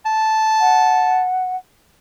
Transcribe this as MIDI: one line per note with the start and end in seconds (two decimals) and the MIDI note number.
0.06 1.24 81
0.60 1.56 78